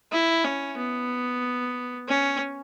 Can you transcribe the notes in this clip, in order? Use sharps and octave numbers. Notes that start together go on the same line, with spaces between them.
E4
C#4
B3
C#4